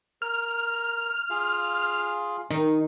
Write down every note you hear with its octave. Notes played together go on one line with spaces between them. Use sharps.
A#4 F6
F4 G#4 F5
D#3 D#4